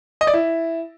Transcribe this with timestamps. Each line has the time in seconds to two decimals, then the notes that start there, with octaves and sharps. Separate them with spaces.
0.21 D#5
0.27 D5
0.34 E4